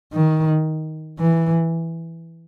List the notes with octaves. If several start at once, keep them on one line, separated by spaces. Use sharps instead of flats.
D#3
E3